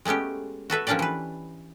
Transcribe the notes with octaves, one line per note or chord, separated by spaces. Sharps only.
G#3 A3 B3 C#4 G4
F#4 A4 B4 E5
F3 A#3 C#4 D4 G4 D5
E3 B4